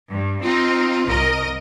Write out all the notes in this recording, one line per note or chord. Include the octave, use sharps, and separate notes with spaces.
G2
C4 D#4 F4
C2 A#4 D#5